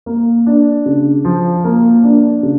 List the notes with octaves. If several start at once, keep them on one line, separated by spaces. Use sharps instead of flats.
A#3
D4
C#3
F3
A#3
D4
C#3